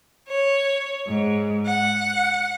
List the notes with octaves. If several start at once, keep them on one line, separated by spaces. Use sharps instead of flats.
C#5
G#2
F#5